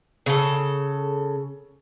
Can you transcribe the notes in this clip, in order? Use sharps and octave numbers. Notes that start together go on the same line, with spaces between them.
C#3 A4